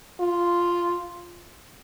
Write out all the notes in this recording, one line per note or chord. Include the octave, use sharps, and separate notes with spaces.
F4